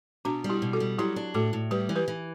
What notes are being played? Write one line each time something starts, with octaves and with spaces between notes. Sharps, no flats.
B2 D4 F#4
G3
E4 G4
B2
F#4 A4
G3
F#3 E4 G4
D4
A2 F#4 A4
A2
G3 G4 B4
E3
G4 B4
E3